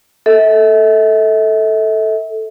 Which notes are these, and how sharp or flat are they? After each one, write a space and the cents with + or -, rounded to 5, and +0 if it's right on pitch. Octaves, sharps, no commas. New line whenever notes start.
A4 +0 E5 -40